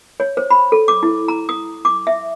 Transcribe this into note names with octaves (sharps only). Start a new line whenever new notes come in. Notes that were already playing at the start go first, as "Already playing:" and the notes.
C#5
C5
B5
A4
D6
E4
A#5
D#6
D6
E5